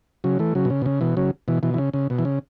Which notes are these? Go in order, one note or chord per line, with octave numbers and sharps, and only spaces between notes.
C#3 F#3
E3 A3
C#3 F#3
B2
C#3
B2
C#3
B2 E3
C#3 F#3
B2 E3
B2 E3
E3
C#3
C#3
B2
E3
C#3